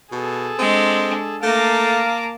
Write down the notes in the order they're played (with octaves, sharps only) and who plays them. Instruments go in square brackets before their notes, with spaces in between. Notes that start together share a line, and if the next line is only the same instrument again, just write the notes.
[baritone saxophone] B2 [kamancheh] G#4 A4
[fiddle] G#3 D4 [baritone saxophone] C4
[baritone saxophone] A3 [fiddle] A#3 D6 [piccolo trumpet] F5 [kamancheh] A5 A#5